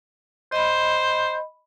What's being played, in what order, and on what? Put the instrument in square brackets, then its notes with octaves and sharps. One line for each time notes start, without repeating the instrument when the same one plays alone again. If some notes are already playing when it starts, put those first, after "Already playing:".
[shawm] C5 [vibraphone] D#5 B5